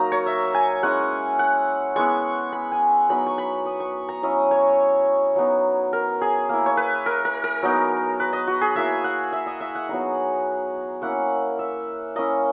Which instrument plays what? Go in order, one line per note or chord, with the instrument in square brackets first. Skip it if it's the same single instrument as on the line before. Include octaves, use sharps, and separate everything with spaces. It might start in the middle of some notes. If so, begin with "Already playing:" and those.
Already playing: [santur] F#3 A#3 D#4 A#5
C#5
E5
G#5
G#3 C#4 E4 F#5
F#5
G#3 B3 E4 C#6
B5
G#5
F#3 B3 D#4 B5
C#6
B5
D#6
C#6
A#5
F#3 C#4 E4 D#5
C#5
F#3 B3 D#4
A#4
G#4
A#3 E4
C#5
B4
A#4
A#4
A#4
F#3 B3 D#4
B4
D#5
F#4
G#4
A#3 E4 E5
F#5
E5
D#5
E5
F#5
F#3 B3 D#4
A#3 C#4 E4 F#5
E5
A#3 C#4 E4 D#5